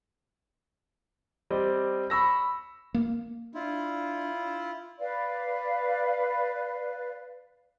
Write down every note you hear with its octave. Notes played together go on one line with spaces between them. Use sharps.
G3 C4 D5 D#5
B5 C#6 E6 A#6
A#3
D4 E4 F4
B4 D5 F5